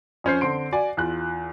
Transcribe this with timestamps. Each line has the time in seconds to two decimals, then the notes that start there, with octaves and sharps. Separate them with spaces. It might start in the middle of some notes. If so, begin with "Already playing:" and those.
0.24 F2 C#4 C5 C7
0.41 D3 C4 C6 D7
0.72 F#4 D5 G#5
0.97 E2 F4 F#6